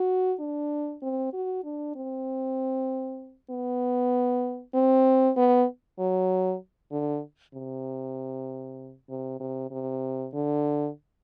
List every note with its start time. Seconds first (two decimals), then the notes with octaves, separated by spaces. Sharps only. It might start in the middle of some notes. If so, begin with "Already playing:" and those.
Already playing: F#4
0.40 D4
1.02 C4
1.33 F#4
1.64 D4
1.96 C4
3.50 B3
4.74 C4
5.37 B3
5.99 F#3
6.92 D3
7.54 C3
9.09 C3
9.40 C3
9.71 C3
10.33 D3